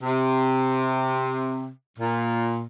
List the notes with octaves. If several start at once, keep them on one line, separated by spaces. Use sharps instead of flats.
C3
A#2